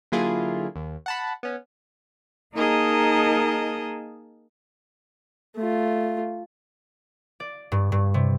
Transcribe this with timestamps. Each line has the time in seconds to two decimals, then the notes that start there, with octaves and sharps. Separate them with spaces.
0.12 D3 F#3 A#3 E4 F4 G#4
0.76 D#2
1.06 F#5 A5 B5
1.43 B3 C#4
2.54 A#3 D#4 G#4 A#4 D#5 A5
5.56 A3 F4
7.40 D5
7.72 G2
7.92 G2
8.14 C3